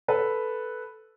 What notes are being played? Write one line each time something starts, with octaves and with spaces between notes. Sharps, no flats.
A4 B4